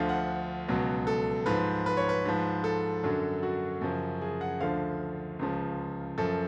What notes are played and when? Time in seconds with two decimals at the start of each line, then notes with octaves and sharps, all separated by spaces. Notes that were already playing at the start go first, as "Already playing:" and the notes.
Already playing: D2 D3 F3 F5
0.09 F#5
0.68 C#2 B2 F#3
1.07 A4
1.46 G#2 F3 B4
1.86 B4
1.97 C#5
2.09 B4
2.25 G#2 F3
2.64 A4
3.03 F#2 D3 F#3
3.43 F#4
3.81 F#2 C#3 F3
4.21 G#4
4.41 F#5
4.60 D2 D3 F3 F5
5.39 C#2 C#3 F3
6.18 F#2 F3 A4